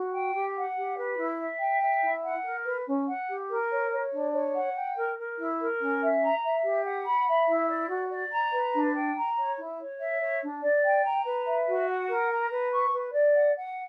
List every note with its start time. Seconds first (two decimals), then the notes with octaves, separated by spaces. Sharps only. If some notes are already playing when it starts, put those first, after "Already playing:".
Already playing: F#4
0.13 G5
0.34 G4
0.55 F#5
0.77 G4
0.98 B4
1.18 E4
1.39 E5
1.59 G5
1.81 E5
2.02 E4
2.23 F#5
2.43 A#4
2.65 B4
2.86 C#4
3.07 F#5
3.28 G4
3.49 A#4
3.69 C#5
3.91 C#5
4.12 D4
4.32 C#5
4.54 F#5
4.74 G5
4.96 A#4
5.17 A#4
5.37 E4
5.59 A#4
5.80 C#4
6.00 E5
6.22 A#5
6.42 E5
6.63 G4
6.84 F#5
7.05 B5
7.27 E5
7.48 E4
7.69 D5
7.89 F#4
8.10 D5
8.31 A#5
8.52 B4
8.73 D4
8.94 G5
9.15 A#5
9.36 C#5
9.57 E4
9.78 C#5
9.99 E5
10.20 C#5
10.41 D4
10.62 D5
10.83 G5
11.03 A#5
11.25 B4
11.45 E5
11.66 F#4
11.87 F#5
12.08 A#4
12.30 A#5
12.51 B4
12.71 C#6
12.92 B4
13.14 D5
13.35 F#5
13.55 F#5